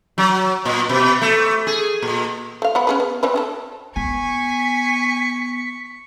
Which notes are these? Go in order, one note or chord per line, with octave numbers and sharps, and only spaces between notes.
F#3
A#2
B2
A3
G#4
A#2
A3 F5
B3 F#5 B5
C#4 G#4 B4
B3
C4 D4 B4
D4 G#4 A4
B3 G#5 C#6 B6